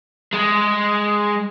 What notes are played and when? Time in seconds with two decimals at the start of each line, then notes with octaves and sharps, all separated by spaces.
0.34 G#3